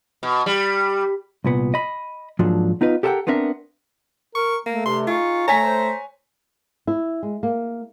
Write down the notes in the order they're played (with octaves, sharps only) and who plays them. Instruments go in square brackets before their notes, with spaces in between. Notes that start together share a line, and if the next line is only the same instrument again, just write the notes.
[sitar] B2
G3
[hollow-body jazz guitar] C2 A#2 B3
D#5 B5
G#2 F3 F#3 A#3 D4
B3 D#4 F4 B4
G4 A4 A#4 E5 F#5 G5
B3 C4 D4 A#4 E5
[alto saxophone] A#4 [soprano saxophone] C#6
[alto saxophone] A3 [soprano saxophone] A#3
[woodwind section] G2 C3 [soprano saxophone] C6
[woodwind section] D#4 G#4 C#6 [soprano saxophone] F4
[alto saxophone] A3 [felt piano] C#5 G#5 B6 [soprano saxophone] A#5
[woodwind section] C5
[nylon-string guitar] E4
G#3
A#3